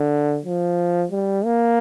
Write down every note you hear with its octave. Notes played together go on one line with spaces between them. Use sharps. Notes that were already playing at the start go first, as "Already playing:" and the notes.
Already playing: D3
F3
G3
A#3